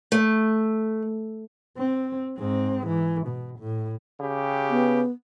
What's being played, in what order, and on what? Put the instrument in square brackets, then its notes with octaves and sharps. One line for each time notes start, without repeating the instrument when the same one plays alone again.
[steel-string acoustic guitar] A3
[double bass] C4
G#2 C4
E3
B2
A2
[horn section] C#3 G4
[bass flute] B3